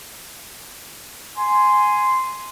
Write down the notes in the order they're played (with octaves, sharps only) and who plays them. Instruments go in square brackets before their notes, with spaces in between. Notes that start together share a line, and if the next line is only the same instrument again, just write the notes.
[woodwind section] G#5 C6